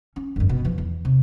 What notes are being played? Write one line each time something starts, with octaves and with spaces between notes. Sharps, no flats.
C#4
G1 F2
B2
E3 F3
E2
C3